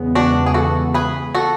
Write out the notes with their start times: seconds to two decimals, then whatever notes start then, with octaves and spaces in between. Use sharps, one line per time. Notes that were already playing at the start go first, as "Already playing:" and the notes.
Already playing: E2 C#3 G#3 B3
0.15 D4 F#4
0.46 G#4
0.54 F#4 A4
0.94 G#4 B4
1.35 F#4 A4